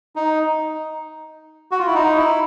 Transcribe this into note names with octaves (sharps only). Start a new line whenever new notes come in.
D#4
F#4
F4
E4
D#4
E4